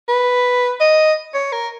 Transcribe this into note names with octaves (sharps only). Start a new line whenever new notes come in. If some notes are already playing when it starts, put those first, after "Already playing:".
B4
D#5
C#5
A#4